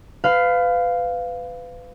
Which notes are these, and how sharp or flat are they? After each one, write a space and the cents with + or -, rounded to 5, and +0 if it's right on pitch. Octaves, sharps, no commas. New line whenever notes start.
B4 +30 F5 +0